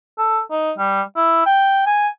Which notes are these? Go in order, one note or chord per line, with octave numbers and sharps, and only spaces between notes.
A4
D#4
G3
E4
G5
G#5